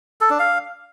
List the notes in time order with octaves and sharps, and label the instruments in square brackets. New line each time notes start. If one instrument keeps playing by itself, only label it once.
[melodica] A4
D4
F5